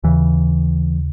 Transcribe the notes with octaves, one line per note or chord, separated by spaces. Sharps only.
D#2 C#3 E3